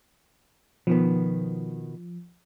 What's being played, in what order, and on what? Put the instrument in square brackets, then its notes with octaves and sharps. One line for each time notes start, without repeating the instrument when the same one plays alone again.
[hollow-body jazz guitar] B2 D#3 B3 [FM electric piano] F3